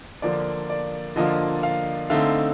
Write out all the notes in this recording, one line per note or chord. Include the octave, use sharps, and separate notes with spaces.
D3 F3 A#3 D4 F4 D5
D5
D3 F3 A#3 D4 F4 D#5
F5
D3 A3 C4 D#4 F5